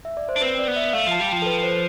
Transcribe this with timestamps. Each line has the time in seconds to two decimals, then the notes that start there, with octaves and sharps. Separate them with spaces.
0.05 E5
0.17 D5
0.29 C5
0.36 D4
0.41 C4 B4
0.59 D5
0.68 B3
0.76 E5
0.93 A3 F5
1.07 F3 A5
1.20 G3
1.29 F3 G5
1.42 A4
1.46 B4
1.63 C5